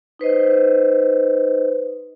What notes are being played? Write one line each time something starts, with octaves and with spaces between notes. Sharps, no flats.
D#4 B4 C5 D#5